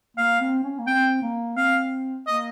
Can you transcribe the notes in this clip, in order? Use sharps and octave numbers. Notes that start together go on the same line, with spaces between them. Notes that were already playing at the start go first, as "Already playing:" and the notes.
A#3 F5
C4
C#4
A#3
C4 G5
A#3
C4 F5
A#3 D#5